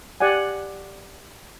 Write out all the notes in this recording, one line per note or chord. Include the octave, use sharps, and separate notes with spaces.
G4 D5 F#5 G#5